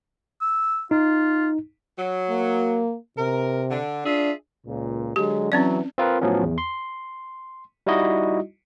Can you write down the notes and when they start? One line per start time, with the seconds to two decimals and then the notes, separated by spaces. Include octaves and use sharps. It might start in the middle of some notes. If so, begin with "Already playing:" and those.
0.41 E6
0.91 D#4 F4
1.98 F#3
2.30 A#3
3.18 C3 A#4
3.70 D3
4.05 D4 F4 G#4 E5
4.67 C#2 A#2
5.16 D3 F#3 G#3 G4
5.52 E3 F#3 C4 C#4 D5
5.98 C4 F4 A#4 B4
6.21 A2 F3 F#3 B3 C#4
6.43 E2
6.58 C6
7.87 G3 D#4 E4 F#4 D#5